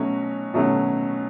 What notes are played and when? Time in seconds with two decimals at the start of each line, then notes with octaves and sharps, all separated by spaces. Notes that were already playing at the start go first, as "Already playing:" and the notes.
Already playing: B2 F#3 A3 C#4 F#4
0.54 B2 F#3 A3 C#4 F#4